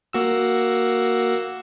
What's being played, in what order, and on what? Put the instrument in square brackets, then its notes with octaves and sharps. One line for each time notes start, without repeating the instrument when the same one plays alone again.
[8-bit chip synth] A#3 F#4 E6